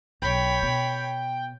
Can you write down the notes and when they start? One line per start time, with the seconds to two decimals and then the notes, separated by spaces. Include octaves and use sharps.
0.22 B1 C#5 G5 B5
0.62 B2